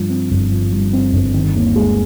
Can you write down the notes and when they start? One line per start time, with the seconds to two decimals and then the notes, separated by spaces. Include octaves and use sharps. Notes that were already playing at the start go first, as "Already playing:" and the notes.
Already playing: G2 F3
0.10 C4
0.31 G1
0.51 F3
0.72 G2
0.93 C4
1.13 G1
1.34 D#3
1.55 D#2
1.76 G#3